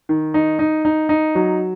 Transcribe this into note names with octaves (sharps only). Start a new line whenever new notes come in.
D#3
D#4
D#4
D#4
D#4
F#3